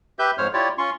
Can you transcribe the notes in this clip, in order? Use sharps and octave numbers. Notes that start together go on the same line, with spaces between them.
G4 B4 E5 G6
F2 G#2 C5 C#5 F6
E4 F4 G4 C#5 D5
C#4 F4 C6 C#6